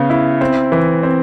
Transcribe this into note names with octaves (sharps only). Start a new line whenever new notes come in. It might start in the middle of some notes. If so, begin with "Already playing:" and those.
Already playing: C#3 B3
E4
C4
E3
C4